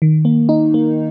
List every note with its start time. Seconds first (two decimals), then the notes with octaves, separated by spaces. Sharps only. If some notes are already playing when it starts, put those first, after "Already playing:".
0.02 D#3
0.25 A#3
0.49 D#4
0.74 A#3